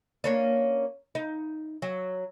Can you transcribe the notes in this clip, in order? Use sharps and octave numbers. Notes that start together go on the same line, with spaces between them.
A#3 C#4 D4
D#4
F#3